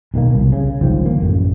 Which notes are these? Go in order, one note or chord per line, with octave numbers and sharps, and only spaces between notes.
B1 D#3 F#3 A#3
C2
C#3
G1 C#2 D#3 F3
A#3
A1 F#2